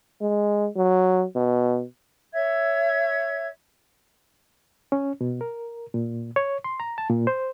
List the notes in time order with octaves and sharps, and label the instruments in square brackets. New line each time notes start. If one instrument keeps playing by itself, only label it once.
[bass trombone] G#3
F#3
B2
[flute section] C#5 E5 G#6
[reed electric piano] C#4
B2
A#4
A#2
C#5
C6
A#5
A5
A#2
C5